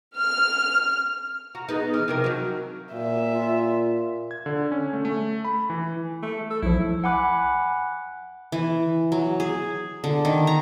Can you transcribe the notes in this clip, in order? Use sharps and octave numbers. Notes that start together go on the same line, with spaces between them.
F6
F#4 A#5
B3 D#4 G#4
E3 F6
C3 F3 A#4
F#3 D#4 F#4
A#2 E5
F4
G#6
D3
C#4
A3
A3
B5
E3
A3
A4
B1 F3 E4
F#5 G#5 B5 D6 F#6
E3
F#3
G#4
D3
D#3
A#5